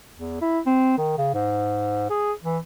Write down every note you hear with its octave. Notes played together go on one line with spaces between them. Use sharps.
E2
E4
C4
D#3
C#3
G#2
G#4
E3